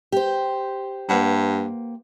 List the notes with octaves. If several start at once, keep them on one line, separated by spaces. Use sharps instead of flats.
G4 C5
G2 A#3 B4 F#5